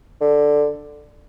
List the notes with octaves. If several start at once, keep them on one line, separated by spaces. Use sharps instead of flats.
D3